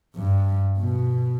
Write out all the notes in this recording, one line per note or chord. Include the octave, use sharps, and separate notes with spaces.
G2
B2